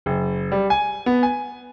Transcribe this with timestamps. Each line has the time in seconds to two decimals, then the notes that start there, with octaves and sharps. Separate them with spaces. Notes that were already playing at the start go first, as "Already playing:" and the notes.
0.06 F#1
0.52 G3
0.70 G#5
1.06 B3
1.23 G#5